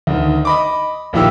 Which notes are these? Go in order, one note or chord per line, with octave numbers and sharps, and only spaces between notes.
D2 D#3
D#5 B5 D6
A#1 A#2 D#3 E4 G4 E6